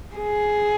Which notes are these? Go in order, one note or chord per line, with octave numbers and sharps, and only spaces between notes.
G#4